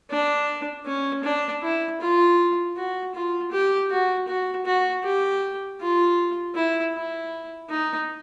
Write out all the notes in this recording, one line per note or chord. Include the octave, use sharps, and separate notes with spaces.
D4
C#4
D4
E4
F4
F#4
F4
G4
F#4
F#4
F#4
G4
F4
E4
E4
D#4